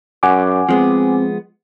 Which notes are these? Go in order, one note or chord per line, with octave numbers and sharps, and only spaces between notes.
F#2 F#5 G#5 D6
F3 G#3 B3 C4